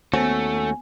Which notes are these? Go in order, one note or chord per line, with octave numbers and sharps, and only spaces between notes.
D#2 A3 B3 C#4 F#4 C5 G#5